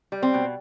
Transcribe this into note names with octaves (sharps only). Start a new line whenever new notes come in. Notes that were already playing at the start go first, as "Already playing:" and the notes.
G3
C4
B2